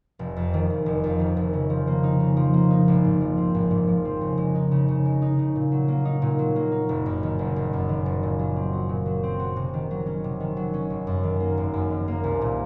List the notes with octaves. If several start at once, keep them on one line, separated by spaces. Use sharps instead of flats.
F1
F2
D#3
F1
F1
F2
D#3
F1
C#3
F3
A#3
D#4
C#3
F3
A#3
D#4
G#1
G#2
F3
C4
G#1
G#2
F3
C4
C#3
G#3
D#4
C#3
C#3
G#3
D#4
C#3
A#2
F#3
A#3
D#4
A#2
F#3
A#3
D#4
F#1
F#2
D#3
F#1
F#1
F#2
D#3
F#1
A#2
F#3
C4
F#4
A#2
F#3
C4
F#4
C3
D#3
F#3
C#4
C3
D#3
F#3
C#4
G#1
F#2
D#3
A#3
G#1
F#2
D#3
A#3
C2
A#2